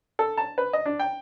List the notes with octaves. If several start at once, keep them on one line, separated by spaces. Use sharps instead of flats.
A4
A5
B4
D#5
D4
G5